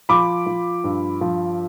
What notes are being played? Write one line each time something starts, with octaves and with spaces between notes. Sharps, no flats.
F3 B5 D6
F3
G2
F3